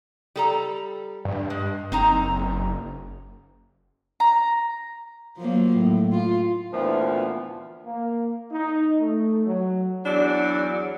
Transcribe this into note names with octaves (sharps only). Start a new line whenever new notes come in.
G3 A4 A#5
G2
G#3
F#1 C4 D#4 A#5
A#5
F3 F#3 A#3
A2
F4
D2 A#2 E3 F3 B3
A#3
D#4
A3
F#3
E2 F#3 D4 D5